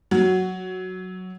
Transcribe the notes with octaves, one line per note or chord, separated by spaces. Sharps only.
F#3